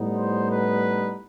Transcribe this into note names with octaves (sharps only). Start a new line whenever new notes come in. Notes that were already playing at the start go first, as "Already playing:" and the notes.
Already playing: A2 G3 B3 D#4
C5
B4